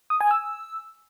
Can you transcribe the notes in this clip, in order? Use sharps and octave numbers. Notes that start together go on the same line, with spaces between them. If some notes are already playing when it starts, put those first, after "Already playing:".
D#6
G#5
E6